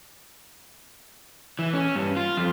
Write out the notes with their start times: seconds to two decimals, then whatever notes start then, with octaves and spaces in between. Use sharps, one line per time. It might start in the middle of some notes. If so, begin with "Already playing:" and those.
1.59 E3
1.73 C#4
1.96 G2
2.17 F4
2.37 F2